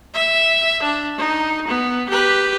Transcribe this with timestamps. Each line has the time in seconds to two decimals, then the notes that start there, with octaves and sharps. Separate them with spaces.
0.14 E5
0.83 D4
1.18 D#4
1.68 B3
2.10 G4 B4